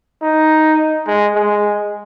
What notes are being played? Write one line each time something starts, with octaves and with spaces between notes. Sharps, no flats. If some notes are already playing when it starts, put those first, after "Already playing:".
D#4
G#3
G#3